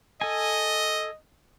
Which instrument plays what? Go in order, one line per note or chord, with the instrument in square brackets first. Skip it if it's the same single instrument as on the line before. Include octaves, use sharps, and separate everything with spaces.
[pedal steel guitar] A4 G#5 [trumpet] D#5